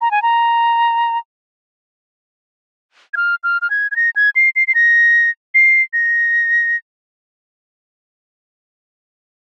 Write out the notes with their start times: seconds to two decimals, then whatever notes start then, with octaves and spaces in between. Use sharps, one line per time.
0.01 A#5
0.11 G#5
0.22 A#5
3.14 G#6
3.17 F6
3.44 F6
3.62 F6
3.70 G#6
3.91 G#6
3.96 A#6
4.16 G#6
4.36 C7
4.56 C7
4.68 C7
4.75 A#6
5.55 C7
5.93 A#6